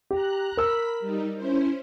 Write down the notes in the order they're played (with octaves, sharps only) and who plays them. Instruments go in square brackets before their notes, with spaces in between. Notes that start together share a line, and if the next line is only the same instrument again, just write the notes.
[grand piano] G4 [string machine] A#5 F#6
[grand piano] A#4 E6 [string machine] B5 B6
[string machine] G3 D#4
C#4 E4 C5